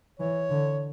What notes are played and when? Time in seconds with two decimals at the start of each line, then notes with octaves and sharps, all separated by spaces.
0.20 E3 C#5
0.50 D3